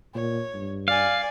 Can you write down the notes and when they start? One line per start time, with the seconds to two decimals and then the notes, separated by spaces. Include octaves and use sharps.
0.15 A#2 C#5
0.54 G2
0.88 D5 F5 G#5